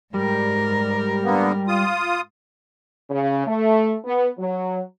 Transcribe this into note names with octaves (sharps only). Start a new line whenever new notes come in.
G#2 G3 A#4
D3 A#3 B3
F4 D#6
C#3
A3
B3
F#3